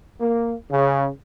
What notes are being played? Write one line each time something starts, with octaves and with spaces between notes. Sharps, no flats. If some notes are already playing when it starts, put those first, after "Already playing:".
A#3
C#3